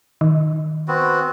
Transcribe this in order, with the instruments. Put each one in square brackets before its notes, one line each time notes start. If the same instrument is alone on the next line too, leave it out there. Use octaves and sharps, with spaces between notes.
[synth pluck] D#3
[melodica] B3 C4 F#4